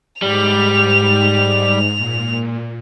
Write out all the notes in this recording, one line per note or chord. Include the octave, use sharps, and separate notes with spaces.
G#2 G3 F7
A#2